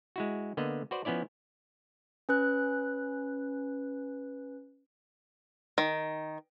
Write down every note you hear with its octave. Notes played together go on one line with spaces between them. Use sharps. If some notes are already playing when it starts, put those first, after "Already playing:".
G#3 E4 F#4
D3 A#3 B3 D#5
F#4 B4 C5 D5
F3 B3 C#4 E4 D5
C#4 B4 F#6
D#3